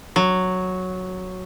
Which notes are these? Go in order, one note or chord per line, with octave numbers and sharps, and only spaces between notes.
F#3